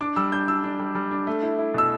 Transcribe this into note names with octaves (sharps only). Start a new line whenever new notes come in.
D4 D6
G3 E6
D4 G6
D4 E6
D4
G3
G3
D4
A3
E4
E4
B2 E6